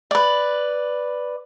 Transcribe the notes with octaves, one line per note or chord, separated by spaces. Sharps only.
B4 D5